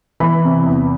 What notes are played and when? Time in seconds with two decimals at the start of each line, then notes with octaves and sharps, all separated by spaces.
0.20 E3 B5
0.44 C3
0.66 E2